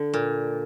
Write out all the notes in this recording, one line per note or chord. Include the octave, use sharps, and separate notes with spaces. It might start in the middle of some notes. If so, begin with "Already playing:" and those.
Already playing: D3
A#2